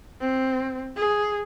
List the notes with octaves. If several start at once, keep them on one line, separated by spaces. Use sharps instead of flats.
C4
G#4